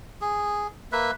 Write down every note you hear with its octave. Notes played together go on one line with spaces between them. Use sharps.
G#4
A#3 B4 E5